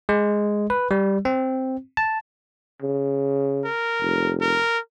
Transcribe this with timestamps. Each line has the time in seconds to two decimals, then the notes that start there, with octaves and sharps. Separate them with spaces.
0.09 G#3
0.70 B4
0.91 G3
1.25 C4
1.97 A5
2.82 C#3
3.65 A#4
4.01 F1
4.41 A#4